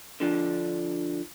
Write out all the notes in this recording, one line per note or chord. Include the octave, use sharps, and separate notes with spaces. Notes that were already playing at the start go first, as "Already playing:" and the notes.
D3 F3 D4